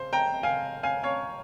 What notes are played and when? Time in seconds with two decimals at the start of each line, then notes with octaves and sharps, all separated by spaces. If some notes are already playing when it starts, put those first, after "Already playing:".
Already playing: C#3 C5
0.13 G5 A#5
0.43 F5 G#5
0.83 F5 G#5
1.03 C#5 F5